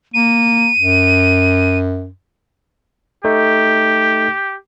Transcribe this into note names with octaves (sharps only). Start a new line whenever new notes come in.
A#3 D#7
F#2
A3 D#4 G4 A4